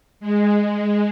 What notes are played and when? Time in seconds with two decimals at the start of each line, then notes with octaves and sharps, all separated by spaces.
0.20 G#3